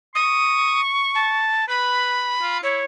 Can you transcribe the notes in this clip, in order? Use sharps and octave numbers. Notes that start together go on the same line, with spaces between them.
C#6 D#6
A5
B4 B5
F4
E4 C#5